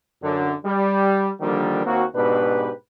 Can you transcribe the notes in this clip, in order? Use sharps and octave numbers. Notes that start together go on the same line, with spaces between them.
F#2 D3
G3
D3 D#3 F3 G3 A#3 D4
D#2 A#3 C4 F#4
G#2 B2 D4 G4 B4